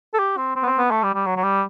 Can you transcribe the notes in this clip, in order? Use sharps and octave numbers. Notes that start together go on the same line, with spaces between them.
A4
G4
C4
C4
B3
C4
B3
A3
G3
G3
F#3
F#3
G3